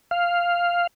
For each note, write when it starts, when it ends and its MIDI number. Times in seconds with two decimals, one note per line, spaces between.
0.11 0.87 77